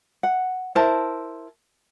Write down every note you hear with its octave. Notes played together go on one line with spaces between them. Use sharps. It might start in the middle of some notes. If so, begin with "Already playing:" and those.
F#5
E4 A#4 C5 A5